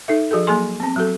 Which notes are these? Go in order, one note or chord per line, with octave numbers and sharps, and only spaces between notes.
D#4 A4 E5
F3 F#4 G#4 A4
F#3 A#3 G#4 G#5 C6
B3 C4
F#3 F#4 A4